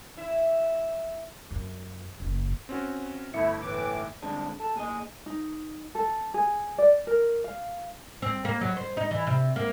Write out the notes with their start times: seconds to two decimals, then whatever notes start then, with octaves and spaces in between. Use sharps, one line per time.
0.17 E4
1.51 F#2
2.20 F#1
2.69 C4 C#4 F#4
3.34 G1 A3 E4 E5 C#7
3.61 A2 E3 D6
4.22 G2 D3 G#3 C4 D4
4.60 A4
4.76 A#2 G#4 A4 D#5
5.26 D#4
5.95 A4
6.34 G#4
6.78 D5
7.07 A#4
7.44 F5
8.22 C4
8.45 A#3
8.61 F#3
8.77 C5
8.97 D#4
9.11 E3
9.27 C3
9.56 A#3